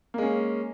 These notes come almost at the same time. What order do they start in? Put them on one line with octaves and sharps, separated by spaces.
A#3 G#3 C#4